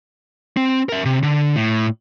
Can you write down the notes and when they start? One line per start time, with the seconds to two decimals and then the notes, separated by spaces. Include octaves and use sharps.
0.57 C4
0.89 A#4 E5
1.05 C3
1.23 D3
1.56 A2